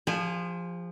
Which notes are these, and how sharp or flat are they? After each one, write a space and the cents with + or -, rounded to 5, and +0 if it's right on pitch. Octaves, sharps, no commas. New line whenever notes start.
F3 +0 G#4 -40 G#5 +5